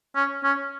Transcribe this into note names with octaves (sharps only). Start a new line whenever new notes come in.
C#4
C#4